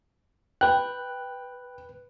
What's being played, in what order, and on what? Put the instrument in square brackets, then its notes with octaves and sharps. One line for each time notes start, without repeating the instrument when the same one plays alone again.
[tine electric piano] B4 F#6 [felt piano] G5